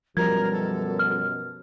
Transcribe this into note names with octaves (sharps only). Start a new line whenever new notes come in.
F#2 B2 F3 G3 A#4 G#6
A4
F6